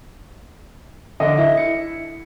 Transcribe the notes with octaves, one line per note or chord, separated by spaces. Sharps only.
D3 D#5
E4
C#7